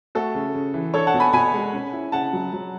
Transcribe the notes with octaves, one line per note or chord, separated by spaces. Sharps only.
A3 F#4 A4
C#3
C#3
E3
D4 A4 C#5
F#5 A5
B2
G#5 B5
B2 G#5 B5
G#3
C#4
E4
C#3 F#5 A5
F#3
F#3